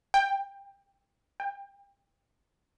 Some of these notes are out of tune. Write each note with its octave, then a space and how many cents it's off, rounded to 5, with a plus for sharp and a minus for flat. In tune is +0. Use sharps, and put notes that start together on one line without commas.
G5 +20
G5 +30